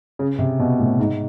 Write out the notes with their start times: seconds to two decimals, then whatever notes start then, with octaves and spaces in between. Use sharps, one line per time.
0.19 C#3
0.39 C3
0.59 B2
0.79 A2
0.99 G#2